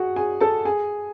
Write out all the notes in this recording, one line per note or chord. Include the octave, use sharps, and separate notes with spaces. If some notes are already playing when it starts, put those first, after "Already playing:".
Already playing: F#4 G#4 F#5
G#4 G#5
A4 A5
G#4 G#5